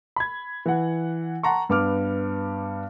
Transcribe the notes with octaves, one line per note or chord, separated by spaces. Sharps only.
B5 G#6
E3 F#5
F#5 A5 A#5 C6 C#6
G2 B3 D6 F6